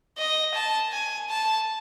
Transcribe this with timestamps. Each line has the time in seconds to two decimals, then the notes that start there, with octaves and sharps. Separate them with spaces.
0.18 D#5
0.55 A5
0.92 G#5
1.30 A5